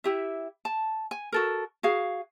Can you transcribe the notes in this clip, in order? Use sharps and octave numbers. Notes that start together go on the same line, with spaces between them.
E4 G4 E5
A5
G#5
F#4 A4 A#4
F#4 G#4 F5